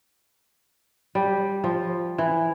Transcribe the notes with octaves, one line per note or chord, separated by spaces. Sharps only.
G3
F3
E3